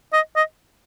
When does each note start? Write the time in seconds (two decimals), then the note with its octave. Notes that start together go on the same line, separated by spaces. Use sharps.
0.13 D#5
0.36 D#5